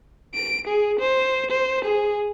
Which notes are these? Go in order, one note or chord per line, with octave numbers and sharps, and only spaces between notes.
D7
G#4
C5
C5
G#4